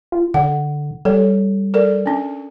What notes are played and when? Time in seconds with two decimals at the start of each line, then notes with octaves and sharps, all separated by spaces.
0.12 F4
0.34 D3 F#5
1.05 G3 A4 C#5
1.74 A4 A#4 D5
2.06 C#4 D4